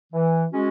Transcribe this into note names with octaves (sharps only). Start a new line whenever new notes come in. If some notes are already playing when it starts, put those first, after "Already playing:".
E3
G#3 C#4 F#4